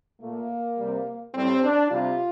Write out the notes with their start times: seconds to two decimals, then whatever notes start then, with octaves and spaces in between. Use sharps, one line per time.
0.20 A#2 A3 A#3
0.77 C3 G3
1.34 A2 G3 C4
1.63 D4
1.90 C3 G3 F4